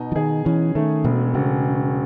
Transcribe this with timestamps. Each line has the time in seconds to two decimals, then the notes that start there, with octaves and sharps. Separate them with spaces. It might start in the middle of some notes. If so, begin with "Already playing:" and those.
Already playing: B2 D#4
0.12 E3
0.16 D#3 G#4
0.45 E3 C#4
0.75 D#3 A3
1.04 E1 B2
1.34 E1 C#3